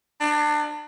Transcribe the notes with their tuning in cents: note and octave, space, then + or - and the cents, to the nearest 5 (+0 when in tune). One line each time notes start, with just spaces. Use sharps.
D4 +30